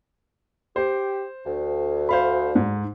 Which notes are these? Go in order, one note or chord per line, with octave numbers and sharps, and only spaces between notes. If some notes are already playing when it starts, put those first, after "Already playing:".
G4 C5
D2
C5 F5 B5
G#2